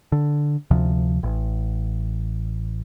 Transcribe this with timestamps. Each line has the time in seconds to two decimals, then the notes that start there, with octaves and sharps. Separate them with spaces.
0.12 D3
0.71 D2 C3 F3
1.23 A1